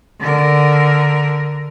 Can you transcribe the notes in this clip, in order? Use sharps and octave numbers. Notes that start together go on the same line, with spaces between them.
D3 A#4